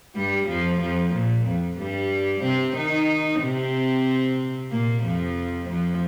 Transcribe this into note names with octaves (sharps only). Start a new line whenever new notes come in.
G2 G3
F2 F3
F2 F3
A#2
F2
G2 G3
C3 C4
D#3 D#4
C3 C4
A#2 A#3
F2 F3
F2 F3